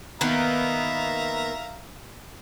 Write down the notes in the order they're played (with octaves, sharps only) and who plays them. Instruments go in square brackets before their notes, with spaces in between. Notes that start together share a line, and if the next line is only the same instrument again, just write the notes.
[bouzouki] D#3 A#3 B3 [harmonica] E5 F5 A#5